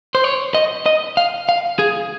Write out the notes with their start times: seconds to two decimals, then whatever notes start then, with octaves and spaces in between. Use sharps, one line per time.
0.15 C5
0.24 C#5
0.54 D#5
0.86 D#5
1.17 F5
1.49 F5
1.79 G#4